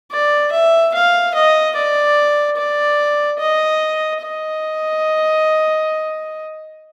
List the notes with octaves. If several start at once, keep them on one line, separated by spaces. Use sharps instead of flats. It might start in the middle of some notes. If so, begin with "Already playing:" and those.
D5
E5
F5
D#5
D5
D5
D#5
D#5